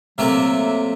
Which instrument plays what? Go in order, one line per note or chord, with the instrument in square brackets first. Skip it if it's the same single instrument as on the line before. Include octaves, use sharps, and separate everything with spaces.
[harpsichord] C3 A3 A#3 [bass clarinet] F#3 [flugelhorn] E5